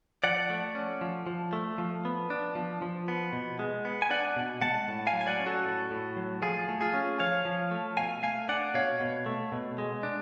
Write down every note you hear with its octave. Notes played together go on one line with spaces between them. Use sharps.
F3 D5 F#5
A3
C#4
F3
F3
A3
F3
B3
D4
F3
F3
B3
B2
G#3
B3
G#5
D4 D5 F#5
B2
G#3 F#5 A5
A2
F5 G#5
F#3
G#5
D5 F#5
C#4
F#4 A4
A2
A2
F#3
F3 F4 G#4
A3
F4 G#4
C#4
F3 C#5 F5
F3
A3
B2 F5 G#5
A3 F5 G#5
D4 D5 F#5
B2 C#5 F5
B2
A3
B2
G#3
D4